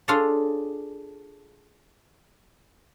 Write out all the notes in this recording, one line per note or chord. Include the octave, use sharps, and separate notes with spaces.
D4 F4 G#4 A4 C#5 D5